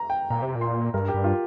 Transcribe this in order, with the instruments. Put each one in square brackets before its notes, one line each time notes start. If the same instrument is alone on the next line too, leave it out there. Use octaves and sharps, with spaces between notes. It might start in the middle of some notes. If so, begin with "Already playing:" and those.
Already playing: [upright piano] A#5
G5
[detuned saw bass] A#2 [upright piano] A#5
[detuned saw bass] C3
A#2
[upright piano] C6
[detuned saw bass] G2 [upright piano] A#4
[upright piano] G4
[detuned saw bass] G2
[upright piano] F4